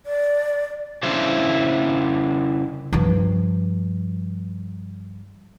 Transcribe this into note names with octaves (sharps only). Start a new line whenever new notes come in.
D5
C#3 D4 E4 C5
G2 F3